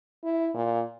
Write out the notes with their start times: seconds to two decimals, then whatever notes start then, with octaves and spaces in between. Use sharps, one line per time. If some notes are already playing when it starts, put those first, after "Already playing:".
0.24 E4
0.55 A#2